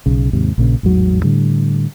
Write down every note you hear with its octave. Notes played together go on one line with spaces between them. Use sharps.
B1 C#3
D#2 G#2 C3
A#1 A#2 C#3
A1 E2 G#2 F#3
A2 D3 G3